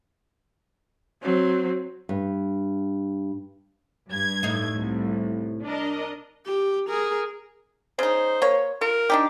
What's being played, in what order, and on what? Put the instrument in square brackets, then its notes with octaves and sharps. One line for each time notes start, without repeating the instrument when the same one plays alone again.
[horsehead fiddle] F#3 C4
[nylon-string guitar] G2
[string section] G2 G#6
[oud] A2 D#4
[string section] C2
D4 A#4 D#5
[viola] G4
G#4 A#4
[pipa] C#3 D#4 [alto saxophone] C5
[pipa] A#3 C#5
[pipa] F4 [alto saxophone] A#4
[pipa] D4 D#4 G4